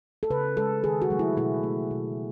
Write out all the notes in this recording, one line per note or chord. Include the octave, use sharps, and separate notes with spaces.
A4
C#3 B4
G#3 A4
D#3 G#4
F#4
F#3 A3
E4
B2 E4
A3
B2